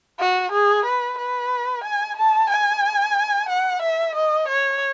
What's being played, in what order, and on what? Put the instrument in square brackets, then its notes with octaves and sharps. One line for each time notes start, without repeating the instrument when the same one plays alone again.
[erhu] F#4
G#4
B4
B4
G#5
A5
G#5
F#5
E5
D#5
C#5